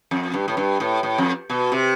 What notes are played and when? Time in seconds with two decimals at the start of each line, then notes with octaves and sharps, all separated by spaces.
0.11 F2
0.34 G2
0.48 A2
0.57 G2
0.80 A2
1.03 A2
1.18 F2
1.50 B2
1.72 C3